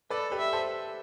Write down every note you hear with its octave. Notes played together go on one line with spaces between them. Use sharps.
A4 B4 D5
G4 B4
E5
A4 C5